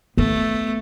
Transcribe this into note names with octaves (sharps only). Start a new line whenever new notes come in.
A3 B3